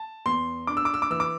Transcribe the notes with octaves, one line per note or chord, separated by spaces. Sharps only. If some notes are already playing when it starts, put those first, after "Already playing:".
Already playing: A5
E2 C6
D4 D6
E6
D6
E6
D6
E3 E6
D6